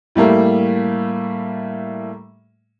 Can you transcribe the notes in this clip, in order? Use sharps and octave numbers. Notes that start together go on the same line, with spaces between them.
A2 G3 A3 A#3